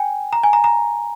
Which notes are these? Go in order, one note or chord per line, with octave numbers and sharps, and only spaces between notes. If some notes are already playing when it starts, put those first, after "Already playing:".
Already playing: G5 G#5
A#5
G#5
A#5
A#5